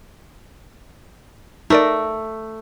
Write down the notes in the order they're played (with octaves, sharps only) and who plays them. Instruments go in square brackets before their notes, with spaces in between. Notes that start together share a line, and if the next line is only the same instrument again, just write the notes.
[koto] A3 [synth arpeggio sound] D#4 A#4 D5